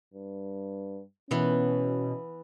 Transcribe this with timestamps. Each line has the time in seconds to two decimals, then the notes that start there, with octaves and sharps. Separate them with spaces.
0.14 G2
1.31 B2 E3 B3 C#4